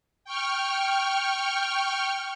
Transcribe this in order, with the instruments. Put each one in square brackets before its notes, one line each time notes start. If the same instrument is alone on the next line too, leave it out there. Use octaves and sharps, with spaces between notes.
[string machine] G5 C#6 F6